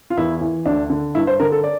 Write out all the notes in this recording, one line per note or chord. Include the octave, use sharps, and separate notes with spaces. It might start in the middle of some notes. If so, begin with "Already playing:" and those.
F4
E2 E4
E3
D2 D4
D3
G2 E4
C5
D3 A#4
A4
D5